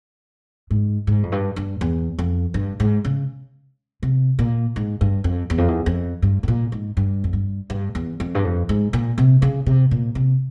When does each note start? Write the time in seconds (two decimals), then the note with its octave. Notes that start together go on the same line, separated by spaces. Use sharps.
0.71 G#2
1.07 G#2
1.23 F2
1.32 G2
1.56 G2
1.81 E2
2.19 F2
2.54 G2
2.80 G#2
3.04 C#3
4.03 C3
4.39 A#2
4.76 G#2
5.01 G2
5.24 F2
5.50 E2
5.58 F2
5.68 E2
5.86 F2
6.22 G2
6.43 G#2
6.48 A#2
6.72 G#2
6.97 G2
7.24 F2
7.33 G2
7.70 G2
7.95 E2
8.20 F2
8.35 G2
8.45 F2
8.69 G#2
8.93 A#2
9.18 C3
9.42 C#3
9.66 C3
9.91 A#2
10.15 C3